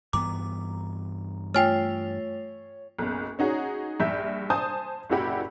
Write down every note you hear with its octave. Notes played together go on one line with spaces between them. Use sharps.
G2 E3 B3 A#5 D6
A3 F4 C#5 G5 G#5 F6
F#1 B1
C#4 D#4 F#4 G#4
A#1 G2 E5 G6
C5 G#5 A5 D#6 G6
F#1 A#2 E4 F#4 G4 B5